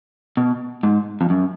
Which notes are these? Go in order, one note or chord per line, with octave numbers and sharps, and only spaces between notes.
B2
G#2
F2
F#2